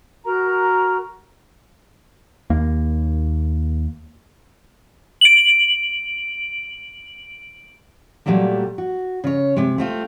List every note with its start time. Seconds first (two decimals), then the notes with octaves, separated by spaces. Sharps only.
0.24 F#4 A#4 A#5
2.50 D#2 A#3
5.21 D7 F#7
8.26 A#2 F#3 G3 A3 A#3
8.78 F#4
9.24 C#3 C#5
9.57 C3 G#3
9.78 A3 C4 F4